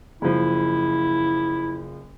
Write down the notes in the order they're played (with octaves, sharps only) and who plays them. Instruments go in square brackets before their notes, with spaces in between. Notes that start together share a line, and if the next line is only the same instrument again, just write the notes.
[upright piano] F#1 F3 [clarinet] E4